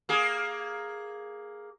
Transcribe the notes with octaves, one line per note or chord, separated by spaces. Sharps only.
A#3 G#4